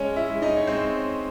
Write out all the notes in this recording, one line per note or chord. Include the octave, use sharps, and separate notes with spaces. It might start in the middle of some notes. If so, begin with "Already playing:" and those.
Already playing: G#3 C#4 C#5
E4 E5
G#3
D#4 D#5
C#5
G#3 C4 C5